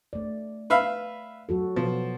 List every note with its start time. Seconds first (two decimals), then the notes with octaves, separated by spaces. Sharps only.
0.13 A3 D5
0.70 B4 E5 F5
1.49 F#3 F#4 A4
1.76 B2 F3 B3